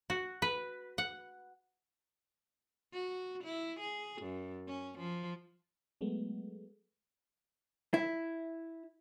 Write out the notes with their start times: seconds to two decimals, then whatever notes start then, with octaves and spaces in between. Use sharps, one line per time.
0.10 F#4
0.42 B4
0.98 F#5
2.93 F#4
3.44 E4
3.79 G#4
4.22 F#2
4.67 C#4
4.98 F3
6.01 F#3 G#3 A3 B3
7.94 E4